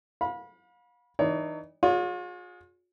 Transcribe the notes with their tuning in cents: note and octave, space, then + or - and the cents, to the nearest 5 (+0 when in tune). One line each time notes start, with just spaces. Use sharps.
F5 +40 B5 -25
E3 -35 D#4 -35 C#5 +40
F4 +45 G#4 +0 C#5 +40